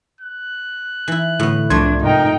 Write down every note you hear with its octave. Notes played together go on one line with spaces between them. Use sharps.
F#6
E3 E4
A2 D3 B3 E4
C2 F2 A2 A3 D4 C6 G#6
G#2 C3 D#4 A#4 G5